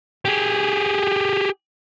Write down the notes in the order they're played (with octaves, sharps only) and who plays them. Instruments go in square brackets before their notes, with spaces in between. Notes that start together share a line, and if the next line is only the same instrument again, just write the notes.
[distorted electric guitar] G4 G#4